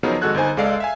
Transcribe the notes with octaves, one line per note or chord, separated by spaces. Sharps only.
C#3 F3 F#3 B3 D#4 A#4
G#1 G#3 F#4 A4 F#6 G#6
G1 D#4 C5 G#5
C#2 G#3 A4 D5 F5 C7
E5 F5 G#5